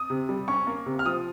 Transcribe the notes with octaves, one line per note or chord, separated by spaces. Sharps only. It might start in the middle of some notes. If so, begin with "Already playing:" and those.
Already playing: D#6
C3
G3
C#4 C#6
A#3
C3
F6
F3 D#6